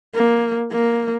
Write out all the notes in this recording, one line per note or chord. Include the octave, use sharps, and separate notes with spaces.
A#3
A#3